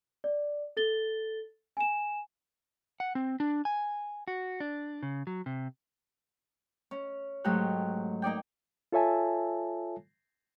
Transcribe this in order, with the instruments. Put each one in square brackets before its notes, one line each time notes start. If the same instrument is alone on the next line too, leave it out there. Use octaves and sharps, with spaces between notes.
[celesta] D5
A4 A6 G7
G#5 E7
[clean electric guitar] F#5
C4
D4
G#5
F#4
D4
C#3
F#3
C3
[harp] C#4
G#2 F#3 A3 F#4 G4 F#6
A#3 D#4 D5 G5
[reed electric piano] F4 A4 C#5 E5 G#5 A5